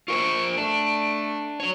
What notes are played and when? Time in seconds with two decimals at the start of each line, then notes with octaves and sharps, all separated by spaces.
0.08 F4 A#4 C5 C#6 D7
0.57 A3 D4
1.60 F#3 C#5